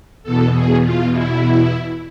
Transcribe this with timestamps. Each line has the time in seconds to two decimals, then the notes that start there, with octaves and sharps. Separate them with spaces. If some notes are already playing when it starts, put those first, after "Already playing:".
0.23 E2 B2 A4
0.53 G#4
0.83 F4
1.12 E4